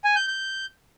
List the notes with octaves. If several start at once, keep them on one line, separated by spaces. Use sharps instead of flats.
G#5
G6
G6